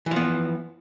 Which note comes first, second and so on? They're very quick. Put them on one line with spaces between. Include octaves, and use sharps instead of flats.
E3 F3 B3